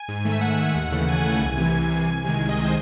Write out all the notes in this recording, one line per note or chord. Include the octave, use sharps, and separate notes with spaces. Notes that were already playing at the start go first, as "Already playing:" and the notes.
Already playing: G#5
G#2
D#3 A3
E5
G#2 F#5
D#3 A3
D#2
C#3 E3 A3
D#2 G#5
C#3 E3 A3
C2
C3 E3
C2
C3 E3
C2
C3 D#3 G#3
C2 G#5
D#5
C3 D#3 G#3
C5